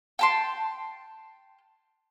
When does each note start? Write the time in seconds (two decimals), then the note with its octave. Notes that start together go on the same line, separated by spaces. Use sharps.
0.19 G5 A5 C6